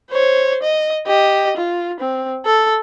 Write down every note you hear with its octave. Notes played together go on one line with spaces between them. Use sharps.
C5 C#5
D#5
G4 D#5
F4
C4
A4